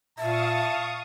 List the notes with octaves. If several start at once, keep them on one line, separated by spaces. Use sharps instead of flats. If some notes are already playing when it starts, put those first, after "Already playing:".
A#2 E5 F5 A5 C#6 D#6